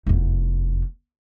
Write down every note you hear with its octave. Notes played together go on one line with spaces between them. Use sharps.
F1 E2